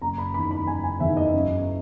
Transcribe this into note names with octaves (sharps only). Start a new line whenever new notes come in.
F#1 A#5
B5
E2 D#3 B5
B5
F#1 G#5
G#5
E2 D#3 E5
D#5
F#2